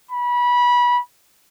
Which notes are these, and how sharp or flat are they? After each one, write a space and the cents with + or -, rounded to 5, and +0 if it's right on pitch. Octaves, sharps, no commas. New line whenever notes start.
B5 -25